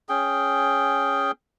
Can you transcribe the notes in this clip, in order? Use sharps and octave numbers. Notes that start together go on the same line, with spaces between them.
C#4 G#4 G5